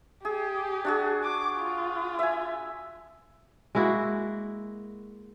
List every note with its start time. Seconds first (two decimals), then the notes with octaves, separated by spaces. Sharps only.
0.25 G4 G#4
0.85 D4 F#4 G#4
1.23 D6
1.57 F4
2.19 E5 G#5
3.75 G#3 A#3 E4 F#4